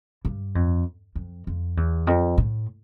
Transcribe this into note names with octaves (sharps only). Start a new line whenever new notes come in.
G2
F2
F2
F2
E2
F2
A2